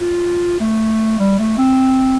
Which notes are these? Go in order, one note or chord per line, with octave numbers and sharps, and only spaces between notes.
F4
A3
G3
A3
C4